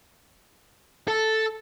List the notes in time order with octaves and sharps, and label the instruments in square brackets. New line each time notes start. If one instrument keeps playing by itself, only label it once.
[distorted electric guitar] A4